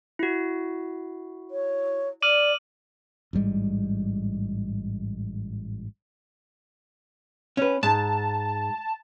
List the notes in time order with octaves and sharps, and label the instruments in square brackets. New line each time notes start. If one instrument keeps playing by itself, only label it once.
[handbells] E4 F#4
[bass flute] C#5
[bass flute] D5 [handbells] D6 F6 [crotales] D#7 F#7
[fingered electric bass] A1 G#2 G3 G#3
[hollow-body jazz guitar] C#4 B4
[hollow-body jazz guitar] G#2 [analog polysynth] A5